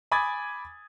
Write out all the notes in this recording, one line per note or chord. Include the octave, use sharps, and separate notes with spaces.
G#5 B5 D6 D#6 G#6 A6